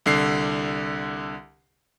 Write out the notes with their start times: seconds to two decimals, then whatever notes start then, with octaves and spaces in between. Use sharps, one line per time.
0.06 C2 D3 C7